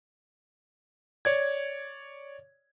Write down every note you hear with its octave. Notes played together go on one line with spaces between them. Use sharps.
C#5 D5 G#6